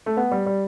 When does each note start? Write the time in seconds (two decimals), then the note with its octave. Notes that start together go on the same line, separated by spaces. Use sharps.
0.06 A3
0.17 B3
0.32 G3
0.46 G3